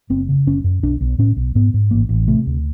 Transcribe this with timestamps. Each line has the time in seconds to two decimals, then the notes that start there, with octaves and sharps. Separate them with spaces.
0.10 F#1 C4
0.29 C#3
0.47 F#1 C#4
0.64 F#2
0.83 B1 D4
1.01 B1
1.19 A2 C#4
1.36 B1
1.55 G#2 B3
1.74 G#2
1.91 A1 A#3
2.09 A1
2.28 C3 A3
2.46 D2